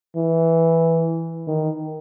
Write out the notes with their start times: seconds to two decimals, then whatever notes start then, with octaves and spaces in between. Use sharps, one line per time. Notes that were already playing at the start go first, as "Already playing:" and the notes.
0.15 E3
1.47 D#3